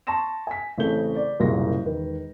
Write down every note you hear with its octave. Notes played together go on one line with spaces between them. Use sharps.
A5 C6 C#6 A#6 E7
G#5 B6
A1 C#3 C4 A4 G6 G7
D5
F#1 C2 A#2 G#3 C6 A#6
E1 D#3 B4